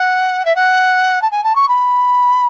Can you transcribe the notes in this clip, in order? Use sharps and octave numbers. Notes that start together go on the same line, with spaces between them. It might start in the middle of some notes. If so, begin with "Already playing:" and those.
Already playing: F#5
E5
F#5
A5
G#5
A5
C#6
B5